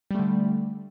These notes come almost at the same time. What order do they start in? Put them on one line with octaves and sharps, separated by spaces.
G3 A3 D3